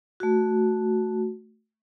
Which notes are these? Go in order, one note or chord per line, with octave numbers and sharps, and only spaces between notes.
A3 F#4